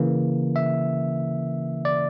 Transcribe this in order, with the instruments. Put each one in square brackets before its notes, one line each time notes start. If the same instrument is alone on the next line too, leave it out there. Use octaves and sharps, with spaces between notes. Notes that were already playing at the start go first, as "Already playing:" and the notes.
Already playing: [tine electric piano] C#3 E3 A#3
E5
D5